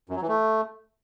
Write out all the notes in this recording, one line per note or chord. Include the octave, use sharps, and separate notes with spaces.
F#2
F#3
E3
A3